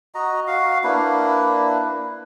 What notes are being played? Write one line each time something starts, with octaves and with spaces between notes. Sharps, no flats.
F#4 D#5 A#5
F#4 F5
A#3 D4 E4 B4